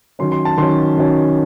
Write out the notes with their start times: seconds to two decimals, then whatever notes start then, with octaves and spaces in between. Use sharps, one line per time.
0.19 D#3 F#3 C#4 C6
0.32 C6
0.45 A5
0.58 D#3 F#3 C#4 C6
0.97 D#3 F#3 C#4